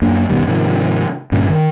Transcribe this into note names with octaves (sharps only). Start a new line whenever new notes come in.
F#2 A#3 D4
G1 B2 D#3 G3
G#2 C3 D#3 F3
G2 A#2 D3 C#4
D#3